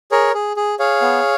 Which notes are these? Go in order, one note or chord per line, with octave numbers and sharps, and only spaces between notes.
G#4 A#4 C#5
G#4
G#4
G#4 C#5 F5
B3